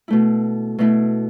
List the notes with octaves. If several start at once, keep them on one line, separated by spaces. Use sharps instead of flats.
B2 A3 E4
B2 A3 E4